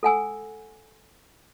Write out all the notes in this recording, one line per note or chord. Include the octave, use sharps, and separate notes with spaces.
A4 F#5 G#5 E6